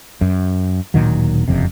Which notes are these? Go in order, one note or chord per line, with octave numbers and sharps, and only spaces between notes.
F#2
D1 A#2 D#3 F#3
F#1 F2 C3